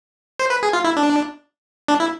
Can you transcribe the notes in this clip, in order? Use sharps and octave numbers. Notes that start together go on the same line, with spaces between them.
C5
B4
G#4
F4
E4
D4
D4
E4